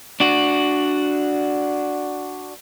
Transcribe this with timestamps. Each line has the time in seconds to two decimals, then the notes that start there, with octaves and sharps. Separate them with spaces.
0.20 D4 F#4